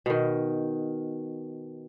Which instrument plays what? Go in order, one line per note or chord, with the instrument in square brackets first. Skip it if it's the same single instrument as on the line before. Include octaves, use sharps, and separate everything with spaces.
[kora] B2 D#3